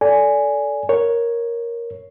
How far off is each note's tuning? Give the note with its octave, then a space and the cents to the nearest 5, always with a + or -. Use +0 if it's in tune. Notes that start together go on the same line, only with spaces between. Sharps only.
A4 +0 D5 -20 G#5 +0
A#4 +5 C#5 +0